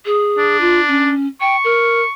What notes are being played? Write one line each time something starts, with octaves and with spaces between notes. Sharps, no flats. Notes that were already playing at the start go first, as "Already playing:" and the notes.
G#4
D4
F4
C#4
G5 C#6
A#4